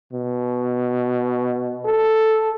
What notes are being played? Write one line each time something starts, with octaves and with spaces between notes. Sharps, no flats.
B2
A4